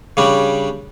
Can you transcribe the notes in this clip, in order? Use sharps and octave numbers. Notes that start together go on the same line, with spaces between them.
C#3 G3 D4